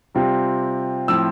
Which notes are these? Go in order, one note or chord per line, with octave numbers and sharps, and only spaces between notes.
C3 G3 C4 F4
A2 F3 C4 E4 E6